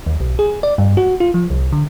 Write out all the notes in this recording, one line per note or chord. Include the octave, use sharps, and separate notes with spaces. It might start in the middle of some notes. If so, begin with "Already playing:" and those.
D#2
B1
G#4
D5
G2
F#4
F4
F3
C2
D3